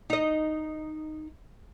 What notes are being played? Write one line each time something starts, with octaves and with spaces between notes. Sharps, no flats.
D#4 D#5